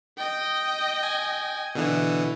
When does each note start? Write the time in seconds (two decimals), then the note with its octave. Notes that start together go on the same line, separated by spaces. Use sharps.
0.18 D#5 G5
1.03 G#5
1.75 B2 D3 E3